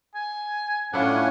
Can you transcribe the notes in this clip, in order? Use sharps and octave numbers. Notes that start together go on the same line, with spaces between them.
G#5
A2 C#4 D4 E4 F4 F#5 G#5